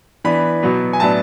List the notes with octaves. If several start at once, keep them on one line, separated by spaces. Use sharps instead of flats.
E3 B3 D4 B5
B2 F#3 B3
G#5
A2 F#3 B3 D4 A5